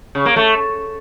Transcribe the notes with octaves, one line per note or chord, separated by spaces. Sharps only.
C#3
A#3
A3